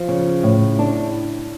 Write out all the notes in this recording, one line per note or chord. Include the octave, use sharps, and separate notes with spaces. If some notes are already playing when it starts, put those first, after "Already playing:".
Already playing: F3
C#3
A2
D4